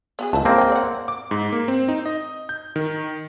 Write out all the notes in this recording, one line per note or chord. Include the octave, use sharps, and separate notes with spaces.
B3 F#4 G#4
C#2 E4 A5
G#3 A#3 C4
G#3 G5
D5 F#5
D6
G#2
A#3
C4
D#4
D#5
G6
D#3